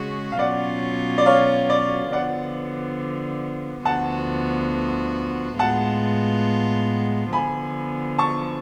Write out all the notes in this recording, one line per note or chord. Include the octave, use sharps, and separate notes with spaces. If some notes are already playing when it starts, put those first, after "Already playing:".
Already playing: C#3 G#3 C#4 F#4
F5
B2 F#3 C#4 F4 D5 F#5
D5
C#5 F5
D5
D3 F3 B3 D5 F#5
D2 D3 F3 B3 F#4 F#5 A5
A2 G#3 B3 F4 F#5 A5
D3 F3 B3 G#5 B5
A5 C#6